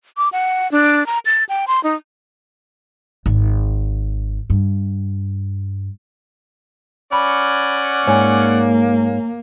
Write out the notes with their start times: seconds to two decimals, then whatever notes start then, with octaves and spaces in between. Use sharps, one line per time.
0.17 D6
0.32 F#5
0.72 D4
1.07 A#5
1.26 A6
1.49 G5
1.68 C6
1.84 D#4
3.26 G#1
4.50 G2
7.12 C#4 D5 F#5 B5
8.07 G#2 A#3 C#5 G#5